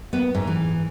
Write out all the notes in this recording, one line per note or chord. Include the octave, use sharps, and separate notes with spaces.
B3
G#2
E3